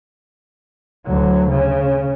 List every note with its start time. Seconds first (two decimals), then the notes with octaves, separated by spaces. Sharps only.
1.06 D2 F#3
1.50 C#3